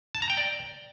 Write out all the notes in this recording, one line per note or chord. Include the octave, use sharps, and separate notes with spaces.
A5
A#5
G5
D5